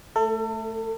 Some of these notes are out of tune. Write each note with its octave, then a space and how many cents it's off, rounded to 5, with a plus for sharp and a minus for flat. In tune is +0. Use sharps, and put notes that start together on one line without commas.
A3 +0 A4 +35